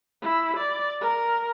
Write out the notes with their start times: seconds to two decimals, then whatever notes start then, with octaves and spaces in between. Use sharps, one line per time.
0.22 E4
0.57 D5
1.01 A#4